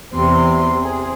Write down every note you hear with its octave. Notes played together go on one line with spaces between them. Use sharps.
E2 C3 C4 C6
C4 G#4